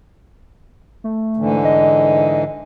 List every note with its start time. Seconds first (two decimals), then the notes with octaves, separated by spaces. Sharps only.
1.04 A3
1.37 G#2 D3 E3
1.64 D#5